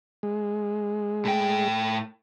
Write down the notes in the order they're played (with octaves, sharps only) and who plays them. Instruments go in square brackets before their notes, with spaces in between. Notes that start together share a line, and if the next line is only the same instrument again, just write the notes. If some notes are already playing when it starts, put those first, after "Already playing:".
[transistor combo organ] G#3
[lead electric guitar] A2 G5